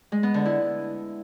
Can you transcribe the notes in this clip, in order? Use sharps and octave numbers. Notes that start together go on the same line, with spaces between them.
G#3
B3
D3
E4